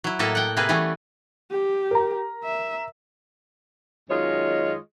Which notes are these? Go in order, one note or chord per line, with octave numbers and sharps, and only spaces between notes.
F#3 E4
A2 A#3 A4 D#5 E5
F#5 G5
C3 A#3 C4 E4 G#4 B4
E3 G3 A3 B3 C#4
G4
A#4 A#5
E5
F#2 D#3 G#3 F4 C#5 D#5